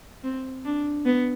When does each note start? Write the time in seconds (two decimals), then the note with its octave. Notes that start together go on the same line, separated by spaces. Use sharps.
0.24 C4
0.65 D4
1.05 B3